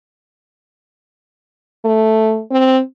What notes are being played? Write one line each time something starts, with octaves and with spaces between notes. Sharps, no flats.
A3
C4